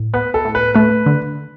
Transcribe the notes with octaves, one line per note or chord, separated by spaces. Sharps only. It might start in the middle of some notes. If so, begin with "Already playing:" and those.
Already playing: A2
B3 B4
A4
A2
B4
A3 B4
D3